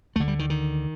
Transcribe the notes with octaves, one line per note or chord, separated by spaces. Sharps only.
D2 D3 A3
G3
D#3
D#3